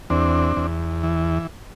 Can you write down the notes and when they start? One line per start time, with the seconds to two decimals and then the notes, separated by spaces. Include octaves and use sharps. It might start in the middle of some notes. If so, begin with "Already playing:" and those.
0.10 E2 C4 D4
0.56 E2
1.03 E3